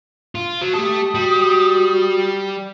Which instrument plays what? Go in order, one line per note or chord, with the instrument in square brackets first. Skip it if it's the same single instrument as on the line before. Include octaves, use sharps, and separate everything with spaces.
[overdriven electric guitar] F4
F#3
[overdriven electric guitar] A3 A4 [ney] G4 [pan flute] D#6
[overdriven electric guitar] G3 [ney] F#4